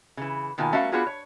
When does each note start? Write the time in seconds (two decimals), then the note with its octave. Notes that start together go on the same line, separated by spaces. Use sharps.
0.17 C#3 E3
0.58 B2 D#3 A#3 F4 G#5
0.72 G3 A3 C#4 F#4 A#4 F5
0.92 B3 D4 F4 F#4 G#4 B4
1.07 C#5